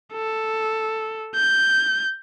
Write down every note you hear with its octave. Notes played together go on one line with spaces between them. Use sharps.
A4
G6